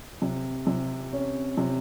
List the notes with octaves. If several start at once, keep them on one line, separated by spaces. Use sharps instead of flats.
C3
C3
C#4
C3